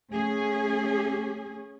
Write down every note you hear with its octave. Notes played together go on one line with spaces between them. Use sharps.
A3 C#4 G#4